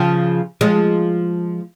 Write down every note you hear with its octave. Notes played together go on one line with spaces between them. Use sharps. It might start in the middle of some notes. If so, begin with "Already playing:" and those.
Already playing: C#3 F3
F3 G#3